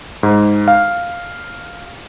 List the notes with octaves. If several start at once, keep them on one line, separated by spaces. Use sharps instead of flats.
G#2
F5